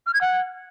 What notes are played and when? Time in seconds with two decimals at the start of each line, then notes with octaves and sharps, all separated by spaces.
0.06 F6
0.14 G#6
0.21 F#5